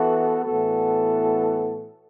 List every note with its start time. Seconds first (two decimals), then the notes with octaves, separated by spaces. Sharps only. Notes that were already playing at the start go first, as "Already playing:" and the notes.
Already playing: E3 B3 F#4 A4
0.45 A2 E3 B3 F#4 A4